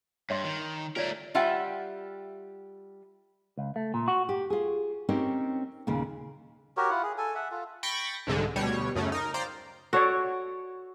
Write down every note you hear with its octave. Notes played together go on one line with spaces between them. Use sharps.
G2 C#5 D#5 C6
D#3
A3 F4 A#4 C#5 D5
G3 F4 E5 F#5 G5
C#2
A3
A#2
F#4
G4
F4 G#4
C4 C#4 D#4 G4 A#4 C#5
D#2 A#2 C#3
F#4 G4 A#4 C#5
E4 F4 F#5
G#4
A4 G#5
E5 F#5
F4 A4
G5 B5 C#6 A6 A#6
C2 G#2 D3 G#3
D2 B2 G3 C#5
F#2 C#3 A3 C#4
D#4 A#4
C5 D5 F5 G5 A#5
F#4 A4 C#5 D5